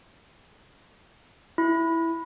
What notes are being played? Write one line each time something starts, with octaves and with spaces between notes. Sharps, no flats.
E4